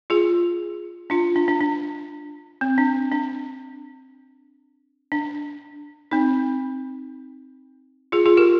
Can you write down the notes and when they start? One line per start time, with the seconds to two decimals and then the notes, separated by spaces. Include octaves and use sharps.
0.10 F4 G#4
1.10 D4 F4
1.36 D4
1.48 D4
1.61 D4
2.61 C4
2.78 D4
3.12 D4
5.12 D4
6.11 C4 D#4
8.12 F4 G#4
8.25 F4 G#4
8.37 G4 A#4